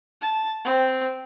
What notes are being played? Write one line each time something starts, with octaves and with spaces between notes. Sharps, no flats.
A5
C4